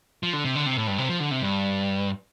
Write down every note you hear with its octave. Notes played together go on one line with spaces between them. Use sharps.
F3
D3
C3
D3
C3
A2
G2
C3
F3
D3
C3
G2